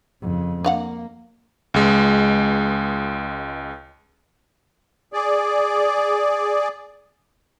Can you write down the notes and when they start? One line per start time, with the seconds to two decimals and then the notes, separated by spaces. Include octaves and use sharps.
0.21 F2 C#3
0.64 A#3 D4 F5 F#5
1.74 C#2 G#3
5.13 G#4 D5